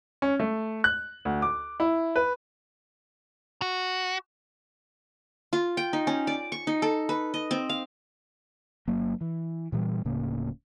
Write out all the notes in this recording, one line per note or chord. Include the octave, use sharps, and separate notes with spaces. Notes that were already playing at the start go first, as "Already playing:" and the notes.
C#4
A3
F#6
D2
D6
E4
B4
F#4
F4
G5
D#4
C#4
D5
C#6
D#4
A4
B4
D#5
C4
F5
G1 F#3 A#3
E3
A#2 E3 F#3 G3
D1 A2 C#3 A#3